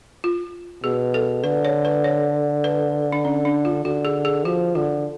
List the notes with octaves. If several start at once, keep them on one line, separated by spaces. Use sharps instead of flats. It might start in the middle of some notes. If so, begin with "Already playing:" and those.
F4
B2 G#4
A4
D3 B4
C#5
B4
C#5
B4
D4
C#4
D4
F4
D3 F#4
G#4
G#4
F3 F#4
D3 F4